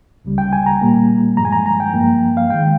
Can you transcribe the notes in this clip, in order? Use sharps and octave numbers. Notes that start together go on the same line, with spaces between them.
C#2 C#3 G3
G5
G#5
A#5
A#2 G3 A#3
G2 F3 G#3 A#5
G#5
A#5
A#5
G5
G2 F3 A#3
F5
D#3 G#3 G5